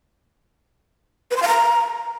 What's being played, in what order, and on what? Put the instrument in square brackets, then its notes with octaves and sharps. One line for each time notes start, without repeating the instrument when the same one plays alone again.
[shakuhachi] B4
C6
F5
A#5